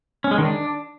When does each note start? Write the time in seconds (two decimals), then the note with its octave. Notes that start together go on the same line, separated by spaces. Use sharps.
0.24 C#4
0.31 G#3
0.38 D#3
0.45 D4